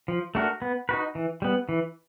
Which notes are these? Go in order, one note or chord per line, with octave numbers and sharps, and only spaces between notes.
F3
A3 D4 F#4 A#4
B3
D#4 F#4 B4
E3
G3 B3
E3